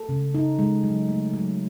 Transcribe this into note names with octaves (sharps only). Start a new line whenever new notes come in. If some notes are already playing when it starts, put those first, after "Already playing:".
Already playing: A4
C#3
D#4
G#3
F#3
A3
F#3